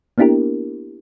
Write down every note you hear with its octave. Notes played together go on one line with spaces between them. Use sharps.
A#3 B3 D4 E4 G4 A#4